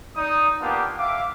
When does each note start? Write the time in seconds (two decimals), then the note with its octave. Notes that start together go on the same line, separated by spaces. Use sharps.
0.16 D#4 D5 D#6
0.61 A#3 B3 D4 F4 G4
0.98 E5 F5 D6